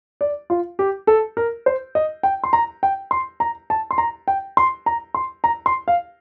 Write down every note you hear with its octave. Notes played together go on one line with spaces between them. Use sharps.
D5
F4
G4
A4
A#4
C5
D#5
G5
C6
A#5
G5
C6
A#5
A5
C6
A#5
G5
C6
A#5
C6
A#5
C6
F5